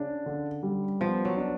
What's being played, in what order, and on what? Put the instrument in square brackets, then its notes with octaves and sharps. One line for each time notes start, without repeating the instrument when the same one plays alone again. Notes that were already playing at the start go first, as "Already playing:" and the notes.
Already playing: [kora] C#3 [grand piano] D4
[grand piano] D3
G3
[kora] F3 [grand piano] B3
[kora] F#3
[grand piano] D4